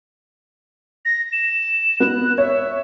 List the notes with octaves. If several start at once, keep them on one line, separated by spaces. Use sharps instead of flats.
A#6
E7
B3 F#6
C#5 E5